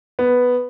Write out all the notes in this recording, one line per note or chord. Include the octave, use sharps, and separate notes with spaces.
B3